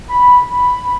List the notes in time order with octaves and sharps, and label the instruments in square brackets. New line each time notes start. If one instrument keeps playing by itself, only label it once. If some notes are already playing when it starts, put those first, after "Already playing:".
[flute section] B5
B5